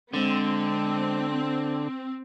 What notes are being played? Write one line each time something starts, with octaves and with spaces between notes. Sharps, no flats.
D3 G#3 C4